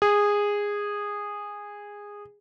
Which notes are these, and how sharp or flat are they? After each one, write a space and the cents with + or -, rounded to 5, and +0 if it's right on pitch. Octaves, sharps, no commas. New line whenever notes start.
G#4 -15